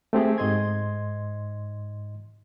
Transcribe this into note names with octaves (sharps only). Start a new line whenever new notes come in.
A3 C4 G4 G#4
G#2 D#5 C6 G#6